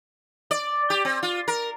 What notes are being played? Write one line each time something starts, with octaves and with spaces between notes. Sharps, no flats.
D5
G4
C4
F4
A#4